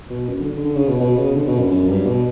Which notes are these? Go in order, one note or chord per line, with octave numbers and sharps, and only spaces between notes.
B2
F#2
D3
D3
D3
C#3
B2
B2
C#3
D3
B2
F#2
F#2
G2
B2